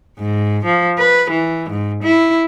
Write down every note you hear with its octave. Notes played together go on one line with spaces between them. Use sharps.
G#2
F3
B4
E3
G#2
E4